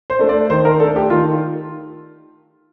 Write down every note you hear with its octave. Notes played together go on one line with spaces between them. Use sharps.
C5
A3 D4
D5
D#3 C5
A#4
A3 D4 A4
G4
D#3 F4